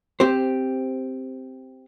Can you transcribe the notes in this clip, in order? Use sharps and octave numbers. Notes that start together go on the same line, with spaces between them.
C4 G4 C5